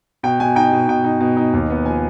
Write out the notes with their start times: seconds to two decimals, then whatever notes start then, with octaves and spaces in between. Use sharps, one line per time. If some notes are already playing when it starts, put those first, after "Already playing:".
0.23 B2 G5
0.40 B2 G#5
0.56 D#4 G5
0.72 B2
0.88 B2 G5
1.04 D#4
1.20 B2
1.37 D#4
1.53 D#2
1.70 B3
1.86 F3 G#5